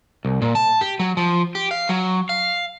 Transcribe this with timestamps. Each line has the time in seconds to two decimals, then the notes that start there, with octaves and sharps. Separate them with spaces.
0.25 C2
0.42 A#2
0.55 A5
0.81 G4
1.00 F#3
1.17 F3
1.55 G4
1.71 F5
1.89 F#3
2.29 F5